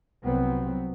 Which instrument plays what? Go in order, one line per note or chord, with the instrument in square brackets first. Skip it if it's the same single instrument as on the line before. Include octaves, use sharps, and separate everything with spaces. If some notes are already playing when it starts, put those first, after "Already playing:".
[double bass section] C2 F#3 B3 C4